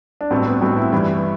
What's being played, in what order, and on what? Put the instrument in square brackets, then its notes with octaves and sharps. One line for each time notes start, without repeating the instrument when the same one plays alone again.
[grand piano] D4
[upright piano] A1 G2 F#3 A3 [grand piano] C4
[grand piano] B3
[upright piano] A1 G2 F#3 A3 [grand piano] C4
[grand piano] E4
[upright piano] G1 G2 E3 G3 [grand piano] E4